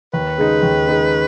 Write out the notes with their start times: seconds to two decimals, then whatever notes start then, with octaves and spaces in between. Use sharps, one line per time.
0.14 D#2 B4
0.38 C#3 G#3 D#4
0.63 D#2
0.88 C#3 G#3 D#4